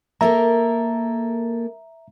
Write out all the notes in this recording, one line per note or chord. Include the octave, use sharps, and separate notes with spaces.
A#3 A4 A#4 E5 A#5